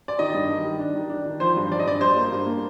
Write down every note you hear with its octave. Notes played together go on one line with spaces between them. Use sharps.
D5
D#3 D#5
G2
D#3
G3
D4
D#3
D4
D#3
F3 C5
G2
F3 D5
D#5
G2 D5
G2 C5
A#3
G2
A#3